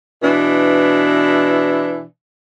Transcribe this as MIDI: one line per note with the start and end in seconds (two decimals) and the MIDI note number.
0.23 2.03 47
0.23 2.03 52
0.23 2.03 62
0.23 2.03 64